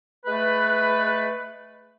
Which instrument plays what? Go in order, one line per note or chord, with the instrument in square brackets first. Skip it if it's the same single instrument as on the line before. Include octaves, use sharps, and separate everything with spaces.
[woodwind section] G#3 A3 B4